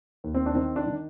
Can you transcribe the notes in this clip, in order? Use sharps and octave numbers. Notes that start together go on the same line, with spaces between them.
D#2
C4
D4
D#3 C4
D4
D#3